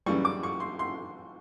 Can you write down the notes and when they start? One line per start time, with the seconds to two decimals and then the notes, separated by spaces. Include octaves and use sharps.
0.06 F#2 C#3 E3 G3 C#6
0.25 D6
0.43 C#6
0.60 C6
0.79 C6